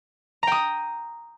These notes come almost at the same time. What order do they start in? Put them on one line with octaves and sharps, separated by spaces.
A#5 G5 D#6